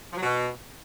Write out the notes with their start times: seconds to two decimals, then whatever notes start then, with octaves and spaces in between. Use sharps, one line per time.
0.12 F3
0.17 F#3
0.23 B2